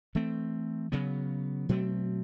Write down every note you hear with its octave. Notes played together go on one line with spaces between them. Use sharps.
E3 A3 C4
C#3 F#3 B3
B2 F#3 A3 C4